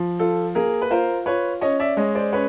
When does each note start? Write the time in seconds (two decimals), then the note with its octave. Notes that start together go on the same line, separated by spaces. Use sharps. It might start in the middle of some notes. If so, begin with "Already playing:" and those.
Already playing: F3
0.19 F4 A4
0.55 A#3 G#4 A#4
0.82 B4
0.91 F4 A#4 C5
1.26 F4 B4 C#5
1.61 C#4 C#5 D#5
1.79 D5 E5
1.97 G#3 C#5 D#5
2.15 C5 D5
2.33 C#4 B4 C#5